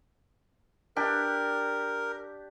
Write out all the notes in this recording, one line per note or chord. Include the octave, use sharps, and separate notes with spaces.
D4 G4 A#4